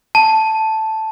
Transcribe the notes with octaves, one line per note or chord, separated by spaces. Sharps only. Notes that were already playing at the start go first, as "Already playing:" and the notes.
A5